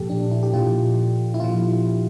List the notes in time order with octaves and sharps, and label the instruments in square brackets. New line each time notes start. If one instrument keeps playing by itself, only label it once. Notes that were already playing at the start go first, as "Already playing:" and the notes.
Already playing: [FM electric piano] A#2 F3 G4 A4
D4
E4
G4
A#2 F3 F4
E4
A#2 F3 F4